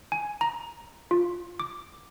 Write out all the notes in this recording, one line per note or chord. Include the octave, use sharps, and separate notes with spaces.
G#5
A#5
F4
D6